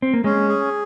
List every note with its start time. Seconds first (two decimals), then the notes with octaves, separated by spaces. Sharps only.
0.02 C4
0.14 A#3
0.24 G#3 C#4
0.49 G#4